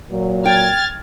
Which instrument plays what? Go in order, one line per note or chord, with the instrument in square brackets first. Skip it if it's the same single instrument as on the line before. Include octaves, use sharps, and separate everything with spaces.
[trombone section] A#2 F#3
[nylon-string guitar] G5 [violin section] F6 G#6 A6